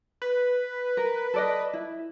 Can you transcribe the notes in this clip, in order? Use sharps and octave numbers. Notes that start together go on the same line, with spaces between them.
B4
A#4
A4 D5 D#5
E4